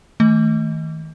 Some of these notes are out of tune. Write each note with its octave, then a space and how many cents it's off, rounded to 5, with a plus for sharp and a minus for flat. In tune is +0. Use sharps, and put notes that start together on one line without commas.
D#3 +35 A3 +0 D#5 +20